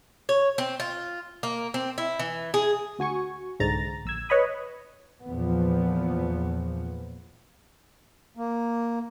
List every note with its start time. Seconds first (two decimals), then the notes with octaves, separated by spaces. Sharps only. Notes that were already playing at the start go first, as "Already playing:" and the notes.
0.29 C#5
0.58 C4
0.80 F4
1.43 A#3
1.74 C4
1.98 E4
2.19 E3
2.54 G#4
2.99 D2 F#4 G#5 C#6
3.60 C2 G#2 D3 A#5 A6
4.05 A#1 E6 G#6
4.29 B4 C#5 D#5 B5 D#6
5.28 E2 A#2 F3 B3
8.37 A#3